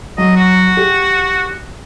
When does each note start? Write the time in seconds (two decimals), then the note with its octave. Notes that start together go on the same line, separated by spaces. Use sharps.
0.18 F#3 D#5
0.36 F#4
0.77 G4